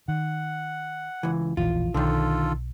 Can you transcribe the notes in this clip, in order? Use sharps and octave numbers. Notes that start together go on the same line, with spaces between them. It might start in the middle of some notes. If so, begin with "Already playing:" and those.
D#3 F#5
C#2 E3
E1 A#1 E3 F4
B1 D3 D#3 F4 A4